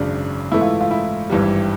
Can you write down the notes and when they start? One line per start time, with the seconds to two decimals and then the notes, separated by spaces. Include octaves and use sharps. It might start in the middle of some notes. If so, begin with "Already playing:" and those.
Already playing: G#1 F#2 C#3 D4
0.52 G#2 E3 A3 E4
0.61 F4
0.81 F4
0.91 E4
1.30 G#1 G2 E3 G3